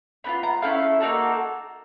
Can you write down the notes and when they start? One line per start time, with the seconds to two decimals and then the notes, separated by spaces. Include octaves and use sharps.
0.24 B3 D4 F4 B5
0.43 A#5
0.62 A3 C#4 E4 A4 F5
1.00 A#3 D#4 F#4 A4